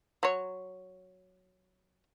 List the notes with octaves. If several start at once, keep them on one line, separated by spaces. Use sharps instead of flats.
F#3 C#5